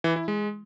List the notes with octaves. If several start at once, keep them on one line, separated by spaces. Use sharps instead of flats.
E3
E4
G#3